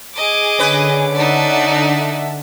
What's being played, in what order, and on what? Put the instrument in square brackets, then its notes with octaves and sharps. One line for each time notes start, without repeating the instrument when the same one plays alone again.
[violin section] G#4 D6 [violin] D#5
[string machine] D3 [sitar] C#4 B4
[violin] D#4 D5 [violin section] E5 F#5 A5